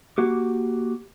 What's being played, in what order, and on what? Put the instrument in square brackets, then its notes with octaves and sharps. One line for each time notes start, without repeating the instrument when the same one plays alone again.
[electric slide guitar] A#3 F#4 G4